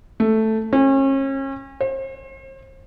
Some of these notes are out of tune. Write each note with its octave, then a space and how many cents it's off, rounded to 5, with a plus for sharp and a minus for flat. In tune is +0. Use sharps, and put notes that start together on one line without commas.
A3 +0
C#4 -35
C5 +40